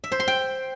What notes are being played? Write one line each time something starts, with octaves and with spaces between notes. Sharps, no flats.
E5
C5
C6
G5